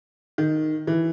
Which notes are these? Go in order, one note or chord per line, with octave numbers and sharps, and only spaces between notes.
D#3
E3